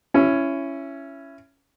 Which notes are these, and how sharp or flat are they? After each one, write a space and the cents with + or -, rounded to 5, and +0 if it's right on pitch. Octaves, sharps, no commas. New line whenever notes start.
C#4 +0 E4 +20